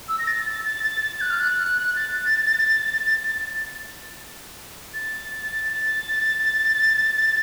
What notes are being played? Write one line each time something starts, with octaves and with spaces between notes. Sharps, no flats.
E6
A#6
A6
A6
A6
A6
A6
F#6
F6
F#6
A6
A6
A6